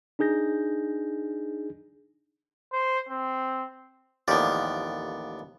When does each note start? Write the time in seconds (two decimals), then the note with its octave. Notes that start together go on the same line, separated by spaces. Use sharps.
0.19 D4 D#4 G#4 G6 A#6
2.73 C5
3.09 C4
4.28 A1 D#2 F3 B3 D5